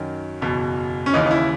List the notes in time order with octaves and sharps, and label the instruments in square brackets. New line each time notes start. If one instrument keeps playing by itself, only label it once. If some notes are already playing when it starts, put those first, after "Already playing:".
Already playing: [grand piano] F#2 D#3 F#3
F#1 E2 B2
C#4
D#2 C#3 E3 D#4
D#4
E4